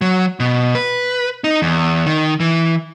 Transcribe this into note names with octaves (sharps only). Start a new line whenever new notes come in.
F#3
B2
B4
D#4
E2
D#3
E3